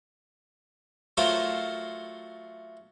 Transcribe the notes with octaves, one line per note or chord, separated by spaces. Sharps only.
F#3 A3 F4 A#4 C5 F5